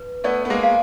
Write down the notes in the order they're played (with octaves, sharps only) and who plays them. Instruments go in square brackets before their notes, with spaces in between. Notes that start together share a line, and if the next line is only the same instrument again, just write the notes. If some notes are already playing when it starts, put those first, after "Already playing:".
Already playing: [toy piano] B4
[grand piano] A3 B3 [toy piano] D5
[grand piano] B3
G#3 A#3
[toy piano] F5